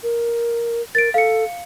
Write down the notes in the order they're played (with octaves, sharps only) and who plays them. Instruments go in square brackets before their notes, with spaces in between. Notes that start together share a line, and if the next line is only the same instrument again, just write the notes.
[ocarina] A#4
[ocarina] A#4 [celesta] A6 D7
[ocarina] A4 [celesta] F5 C#7